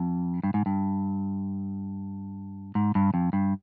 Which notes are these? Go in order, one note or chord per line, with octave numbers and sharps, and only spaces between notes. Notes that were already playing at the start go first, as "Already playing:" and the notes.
Already playing: F2
G2
G#2
G2
G#2
G2
F2
G2